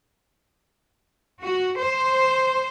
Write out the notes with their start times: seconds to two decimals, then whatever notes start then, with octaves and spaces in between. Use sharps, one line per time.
1.41 F#4
1.77 C5